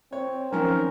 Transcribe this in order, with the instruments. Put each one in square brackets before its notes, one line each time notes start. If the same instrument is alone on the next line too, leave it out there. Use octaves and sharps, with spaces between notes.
[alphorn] C4 [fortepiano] C#5
[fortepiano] D#3 F3 [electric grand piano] C#4 C5 [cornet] A#4